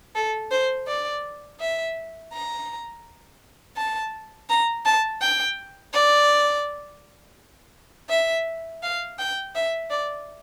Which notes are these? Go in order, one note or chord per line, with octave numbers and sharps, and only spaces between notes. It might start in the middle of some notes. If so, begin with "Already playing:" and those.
A4
C5
D5
E5
A#5
A5
A#5
A5
G5
D5
E5
F5
G5
E5
D5